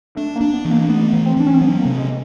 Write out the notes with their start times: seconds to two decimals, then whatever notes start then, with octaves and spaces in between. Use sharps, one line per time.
0.16 A3 D4
0.35 A#3
0.41 D4
0.53 B3
0.65 E3
0.71 A#3
0.89 A3 B3
1.13 E3
1.26 C4
1.37 E3 D4
1.46 C#4
1.54 C4
1.61 F#3 B3
1.80 A#3
1.85 C3
1.97 G#3